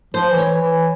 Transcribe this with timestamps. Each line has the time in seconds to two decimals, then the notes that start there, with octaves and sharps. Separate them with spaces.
0.14 F3 C5
0.30 E3
0.38 C#5
0.46 E3
0.61 E3